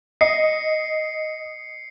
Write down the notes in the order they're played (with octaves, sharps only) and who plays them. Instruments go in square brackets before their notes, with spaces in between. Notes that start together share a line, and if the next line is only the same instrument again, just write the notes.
[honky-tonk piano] D#5 [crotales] C7 C#7